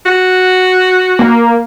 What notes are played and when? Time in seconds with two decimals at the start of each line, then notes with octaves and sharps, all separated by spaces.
0.06 F#4
1.19 A#3